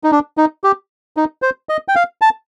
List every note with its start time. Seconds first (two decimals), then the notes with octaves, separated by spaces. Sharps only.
0.04 D#4
0.11 D4
0.37 D#4
0.64 G4
1.17 D#4
1.42 C5
1.69 D#5
1.88 G5
1.96 F5
2.22 A5